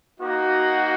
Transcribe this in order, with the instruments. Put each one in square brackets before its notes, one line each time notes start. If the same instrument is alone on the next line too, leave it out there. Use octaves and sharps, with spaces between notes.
[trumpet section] A#3 D#4 F#4